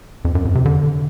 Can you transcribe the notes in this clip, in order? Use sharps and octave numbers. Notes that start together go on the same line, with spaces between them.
F2
F#2
F2
C3
D3